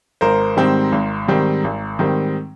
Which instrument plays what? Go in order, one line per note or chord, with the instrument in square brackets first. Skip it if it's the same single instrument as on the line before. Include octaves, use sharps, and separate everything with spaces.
[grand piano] G#1 A#4 C5
G#2 D#3 G3 C4
G#1
G#2 D#3 G3 C4
G#1
G#2 D#3 G3 C4